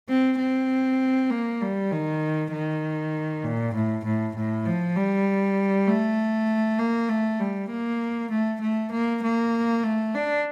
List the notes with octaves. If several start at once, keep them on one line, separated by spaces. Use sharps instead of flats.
C4
C4
A#3
G3
D#3
D#3
A#2
A2
A2
A2
F3
G3
A3
A#3
A3
G3
A#3
A3
A3
A#3
A#3
A3
D4